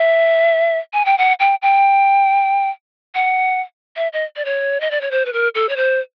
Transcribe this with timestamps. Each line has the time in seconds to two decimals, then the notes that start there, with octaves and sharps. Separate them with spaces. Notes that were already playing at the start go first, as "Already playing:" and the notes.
Already playing: E5
0.93 G#5
1.05 G5
1.18 F#5
1.40 G5
1.62 G5
3.15 F#5
3.96 E5
4.13 D#5
4.36 D5
4.45 C#5
4.81 D#5
4.91 D5
5.01 C#5
5.11 C5
5.25 B4
5.33 A#4
5.55 A4
5.69 C#5
5.76 C5